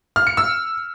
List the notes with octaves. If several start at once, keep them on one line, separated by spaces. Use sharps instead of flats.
F6
C#7
E6